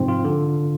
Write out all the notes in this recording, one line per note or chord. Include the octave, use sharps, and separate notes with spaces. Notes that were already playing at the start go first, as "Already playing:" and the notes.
Already playing: G#2 C3 F3 C4
F4
D3